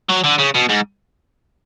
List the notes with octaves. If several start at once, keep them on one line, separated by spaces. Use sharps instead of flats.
F#3
D3
C#3
B2
G#2